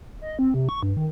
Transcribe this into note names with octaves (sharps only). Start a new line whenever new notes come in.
D#5
C4
C3
C#6
G2
D#3